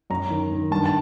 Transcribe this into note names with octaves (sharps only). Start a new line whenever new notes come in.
F#2 A#5
D#3
D#3
G2 A5
A5